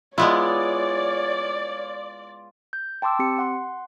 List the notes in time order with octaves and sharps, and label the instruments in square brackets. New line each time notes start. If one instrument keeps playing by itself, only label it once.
[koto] G#3 B3 E4 [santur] F4 [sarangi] C#5 [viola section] D5
[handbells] G6
G5 A5 C6 D6 E6
C4 G4 C#7
F#5 C6